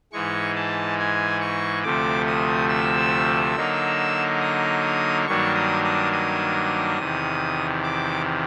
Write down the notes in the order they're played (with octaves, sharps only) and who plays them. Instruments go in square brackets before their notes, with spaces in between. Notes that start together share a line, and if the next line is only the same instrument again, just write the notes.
[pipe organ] G#2 E3 G#3 C#6
A5
G#5
C#6
D2 C3 F3 A3 D6
D#6
E6
D3 F#3 A#3 D#4
D#6
G2 D#3 F#3 A#3 D4 C#6
D#6
D#6
D#6
E2 C3 D#3
D6